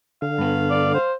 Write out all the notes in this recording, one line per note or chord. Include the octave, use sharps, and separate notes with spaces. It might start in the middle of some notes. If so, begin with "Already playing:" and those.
D3 F5
G2 B3
D5
C5